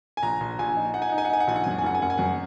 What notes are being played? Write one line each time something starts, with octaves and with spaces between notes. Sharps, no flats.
G#5
A#1 A#5
A#1
A#1 G#5
D#4
D#4 F#5
G#5
D#4 F#5
G#5
F#5
D#4 G#5
F#5
A#1 G#5
F#5
G#5
F#2 F#5
G#5
F#1 F#5
G#5
F#1 F#5
G#5
F#2 F#5